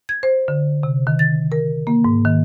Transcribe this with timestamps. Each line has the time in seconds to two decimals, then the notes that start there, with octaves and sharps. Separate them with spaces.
0.09 G#6
0.23 C5
0.48 D3
0.83 C3
1.07 D#3
1.19 A6
1.52 A#4
1.87 A#3
2.05 G#2
2.25 D#3